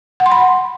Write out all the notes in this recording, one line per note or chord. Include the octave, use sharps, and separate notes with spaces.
F#5
C6
B5